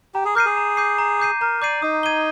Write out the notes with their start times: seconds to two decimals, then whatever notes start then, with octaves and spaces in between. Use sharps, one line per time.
0.14 G4 A#5
0.25 G#4
0.35 A#4 D6 G6 C7 D#7
0.46 G#4
0.57 A#5
0.77 D6 G6 C7 D#7
0.98 A#5
1.20 D6 G6 C7 D#7
1.41 A#4 A#5
1.62 D5 D6 G6 C7 D#7
1.82 D#4 D#6
2.03 G#6 D#7 G7